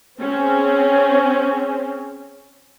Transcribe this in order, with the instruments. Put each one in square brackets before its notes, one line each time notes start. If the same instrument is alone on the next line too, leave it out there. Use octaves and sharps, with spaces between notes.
[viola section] C4 C#4 G#4